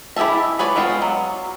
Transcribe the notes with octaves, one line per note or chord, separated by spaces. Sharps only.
E4 G4 G#4 E5 A5
G#4 B4 C#5 D5
G#3 B3 C4 F4
F#3